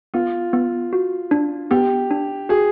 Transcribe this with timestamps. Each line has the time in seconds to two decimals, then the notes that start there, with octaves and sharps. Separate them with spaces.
0.14 B3 F4
0.53 B3
0.93 F#4
1.31 D4
1.71 B3 G4
2.11 D4
2.49 F#4 G#4